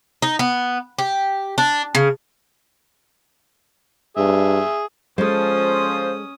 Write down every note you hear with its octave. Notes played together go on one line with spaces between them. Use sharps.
D#4
B3
G4
D4
C#3
G2 G#4 E5
F3 G#3 C#4 A4 C5 D#6